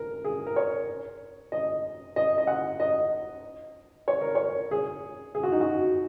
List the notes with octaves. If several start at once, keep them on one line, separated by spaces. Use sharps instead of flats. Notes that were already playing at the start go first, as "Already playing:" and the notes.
Already playing: A#4
G#4
A#4
C#5
D#5
D#5
D#5
F#5
D#5
C#5
A#4
C#5
G#4
G#4
F#4
D#4
F#4